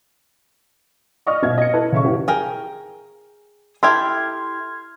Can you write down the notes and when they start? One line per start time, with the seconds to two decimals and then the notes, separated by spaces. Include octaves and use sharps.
1.26 D5 D#5 C#6 D#6 F6
1.43 G1 B2 E5 G#6
1.58 D#5 C#7
1.73 E4 A4 B4 A5
1.92 C#3 E5 C#6
2.05 G1 E3 G4
2.28 G#4 A#4 G5
3.83 E4 G4 A4 C6 F6 G#6